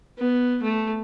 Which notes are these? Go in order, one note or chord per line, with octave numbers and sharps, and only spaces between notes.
B3
A3